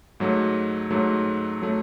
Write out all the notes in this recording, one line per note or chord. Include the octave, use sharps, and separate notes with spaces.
G#2 F#3 A3
G#2 F#3 A3
F#3 A3